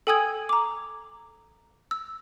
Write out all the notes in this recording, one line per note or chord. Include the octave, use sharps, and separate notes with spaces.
A4 G5 G#5 D#6 E6 G#6
A#5 D6
E6